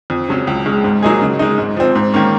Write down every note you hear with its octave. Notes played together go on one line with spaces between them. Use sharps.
F2
C#3 F#3 C#4
C#2
C#3 G#3 C#4
G#2
F#3 A#3 D#4 G#4
C#3
G#3 D#4
G#2
F3 C4
G#2
D#3 A#3 C#4